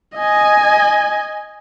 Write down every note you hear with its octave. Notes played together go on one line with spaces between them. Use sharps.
D#5 G#5